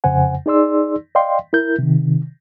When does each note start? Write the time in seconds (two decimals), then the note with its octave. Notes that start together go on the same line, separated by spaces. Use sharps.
0.04 F2 C#3 C5 F#5 G#5
0.46 D#4 G#4 D5 C6 E6
1.15 D5 D#5 F5 G5 C6
1.53 E4 A#4 G6
1.78 C3 D#3